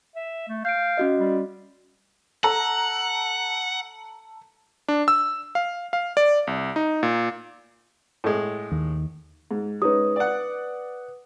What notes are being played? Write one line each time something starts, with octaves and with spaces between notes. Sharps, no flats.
E5
A3
F5 G6 D7
C#4 F#4 D#5
G3
A4 F#5 A#5
D4
E6
F5
F5
D5
C2
D#4
A#2
A2 G#3
D#2
G#2
G#3 C#4 D#4 B4 D#6
D5 F#5